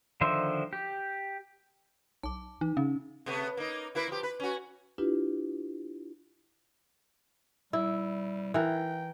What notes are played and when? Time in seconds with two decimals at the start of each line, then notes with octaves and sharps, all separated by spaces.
0.21 D3 D#3 F3 C5 E5
0.73 G4
2.23 B1 A5 D6
2.61 E3 D#4
2.77 C#3 C#4
3.26 C3 A3 B3
3.57 A#3 D#4
3.95 A#3 E4 B4
4.08 F3 G4
4.23 B4
4.40 C#4 F#4
4.98 D4 E4 F4 G4 B4
7.73 G3 E4
8.54 E3 A#4 G5